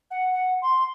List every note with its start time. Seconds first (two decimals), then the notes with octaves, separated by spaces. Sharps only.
0.11 F#5
0.32 F#5
0.62 C6